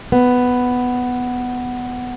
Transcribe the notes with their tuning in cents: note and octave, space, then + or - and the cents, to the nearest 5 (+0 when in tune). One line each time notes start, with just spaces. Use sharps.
B3 +5